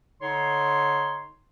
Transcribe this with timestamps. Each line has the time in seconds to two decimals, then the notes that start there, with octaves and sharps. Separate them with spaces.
0.21 D3 D#4 C#5 C6